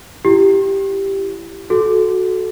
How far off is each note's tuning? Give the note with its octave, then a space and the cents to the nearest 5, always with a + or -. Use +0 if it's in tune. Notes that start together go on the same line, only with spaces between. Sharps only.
E4 +35 G4 +0
F#4 +0 A4 -20